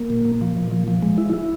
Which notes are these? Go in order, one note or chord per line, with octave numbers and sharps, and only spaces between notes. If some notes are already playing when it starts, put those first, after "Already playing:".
Already playing: A#3
A#2
A#2
F3
A#2
F3
F3
G#3
E4
E4